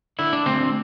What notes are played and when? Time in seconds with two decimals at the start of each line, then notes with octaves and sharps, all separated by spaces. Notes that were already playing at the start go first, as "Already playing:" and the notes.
0.19 D3 E4
0.33 D4
0.46 D2 C4